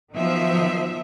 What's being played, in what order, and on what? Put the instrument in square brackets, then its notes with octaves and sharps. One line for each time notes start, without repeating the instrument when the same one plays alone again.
[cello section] D#3 F3 F#3 B3 E5